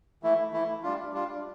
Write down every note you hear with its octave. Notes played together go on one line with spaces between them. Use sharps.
E3 A3 E4
E3 A3 E4
G3 D4 F4
G3 D4 F4